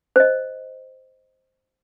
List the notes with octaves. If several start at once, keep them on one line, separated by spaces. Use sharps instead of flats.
C5 D#5